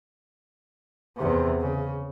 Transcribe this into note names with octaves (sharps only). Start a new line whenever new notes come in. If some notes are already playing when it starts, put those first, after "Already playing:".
E2 C3
C#3